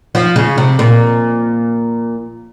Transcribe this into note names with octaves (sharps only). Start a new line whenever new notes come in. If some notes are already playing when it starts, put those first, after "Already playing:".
F3
C#3
C3
A#2